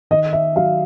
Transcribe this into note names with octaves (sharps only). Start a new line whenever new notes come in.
D#3 D#5
E5
F#3 F5